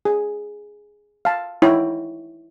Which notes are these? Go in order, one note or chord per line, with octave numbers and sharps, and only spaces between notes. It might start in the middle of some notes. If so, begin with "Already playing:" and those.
G#4
F5 A5
D#4 E4 C#5 G5